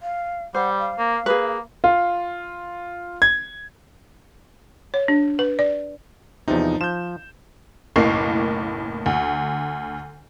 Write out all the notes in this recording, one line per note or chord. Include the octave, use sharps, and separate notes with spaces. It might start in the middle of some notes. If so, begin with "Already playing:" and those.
F5
G3 C5 F#5
F5
A#3
A#3 G#4 B4
F4
G#6
C#5
D4
B4
D5
E2 C3 F3 D#4
F3 G6 E7
F#1 B1 A2 A#3 C#6 C7
D2